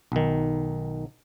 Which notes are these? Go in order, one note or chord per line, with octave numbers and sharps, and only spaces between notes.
B1 D#3